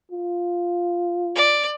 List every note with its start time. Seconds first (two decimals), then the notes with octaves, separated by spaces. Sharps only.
0.11 F4
1.36 D5